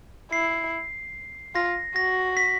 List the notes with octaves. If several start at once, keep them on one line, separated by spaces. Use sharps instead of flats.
E4 C7
F4 A#6
F#4 A#6
B6